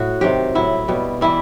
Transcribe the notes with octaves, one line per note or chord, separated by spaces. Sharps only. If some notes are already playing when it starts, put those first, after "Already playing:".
Already playing: A2 F#4
C3 D#3 F#3 G4
A2 F#3 E4
B2 G3
E3 G3 E4